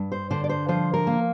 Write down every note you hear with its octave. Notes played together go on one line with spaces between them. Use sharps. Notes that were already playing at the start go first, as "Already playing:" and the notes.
Already playing: G2
C5
D3 C5
D5
C5
F3 C5
A#4
A#3